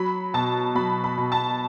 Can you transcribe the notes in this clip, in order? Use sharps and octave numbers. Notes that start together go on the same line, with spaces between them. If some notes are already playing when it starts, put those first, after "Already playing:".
Already playing: F#3 B5
B2 A5
F#3 B5
B5
B2
A5